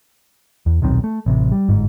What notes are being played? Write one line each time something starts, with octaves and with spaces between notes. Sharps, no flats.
E2
D#1 B1 D#3 C4
A3
A1 C3
G3
G1 G#2